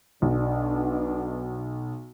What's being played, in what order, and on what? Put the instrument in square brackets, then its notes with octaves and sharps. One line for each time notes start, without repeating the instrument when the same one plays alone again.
[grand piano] B1 [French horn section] B2 D4